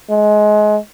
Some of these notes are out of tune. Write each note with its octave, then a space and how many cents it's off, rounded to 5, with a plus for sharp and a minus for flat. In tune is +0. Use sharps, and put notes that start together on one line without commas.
G#3 +25